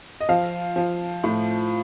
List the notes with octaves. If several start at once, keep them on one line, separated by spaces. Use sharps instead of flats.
D#5
F3 F5
F3
A2